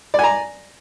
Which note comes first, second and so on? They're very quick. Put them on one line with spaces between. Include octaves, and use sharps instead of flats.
D5 G#5 A#5